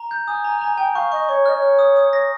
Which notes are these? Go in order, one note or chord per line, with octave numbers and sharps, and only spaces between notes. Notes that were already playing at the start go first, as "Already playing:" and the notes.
Already playing: A#5
G6
G#5 D#6
A#5
A#5
G5 G#5
F5 C#6
D#5 C#6
C#5 C#6
D#5 F6
C#5
F6
D#6
D#6
A#6